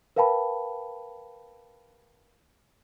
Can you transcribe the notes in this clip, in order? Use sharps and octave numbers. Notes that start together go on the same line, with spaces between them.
A#4 B4 F5 G5 A5 B5